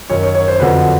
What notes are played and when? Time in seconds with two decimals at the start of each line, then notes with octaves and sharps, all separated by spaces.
0.10 F#2 D#3 F#3 C#5
0.23 C#5
0.35 C#5
0.48 C5
0.60 F2 D3 F#3 B4